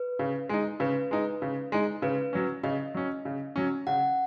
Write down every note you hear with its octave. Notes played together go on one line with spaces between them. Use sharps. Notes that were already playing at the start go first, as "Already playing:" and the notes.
Already playing: B4
C#3
G#3 D#4
C#3 B4
G#3 D#4
C#3
G#3 D#4
C#3 B4
F#3 C#4
C#3 D#5
F#3 C#4
C#3
F#3 C#4
C#3 F#5